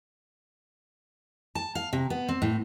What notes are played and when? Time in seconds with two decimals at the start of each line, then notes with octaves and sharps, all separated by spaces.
1.55 A5
1.75 F5
1.93 C3
2.10 B3
2.29 C4
2.42 A2